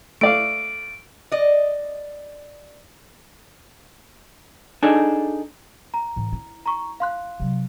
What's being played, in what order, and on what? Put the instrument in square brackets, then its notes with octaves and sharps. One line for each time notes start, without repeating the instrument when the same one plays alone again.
[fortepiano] A3 D5 F5 [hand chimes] D7
[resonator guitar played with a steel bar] D5 D#5
[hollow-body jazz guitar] D4 D#4 G#4 A4 D5
[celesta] A#5
[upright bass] A2 E3
E4
[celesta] A#5 C#6
F5 C6 F#6
[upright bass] C3 F#3